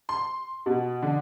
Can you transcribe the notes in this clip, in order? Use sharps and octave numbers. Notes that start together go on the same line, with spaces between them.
C6
B2
D3